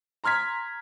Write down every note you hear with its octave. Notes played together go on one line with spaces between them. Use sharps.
A#5 C6 F6 G#6 B6